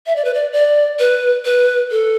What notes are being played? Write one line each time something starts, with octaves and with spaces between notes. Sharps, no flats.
E5
D5
B4
D5
D5
B4
B4
A4